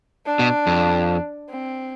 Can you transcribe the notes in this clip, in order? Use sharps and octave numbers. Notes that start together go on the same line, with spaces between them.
D4
B2
F2
C4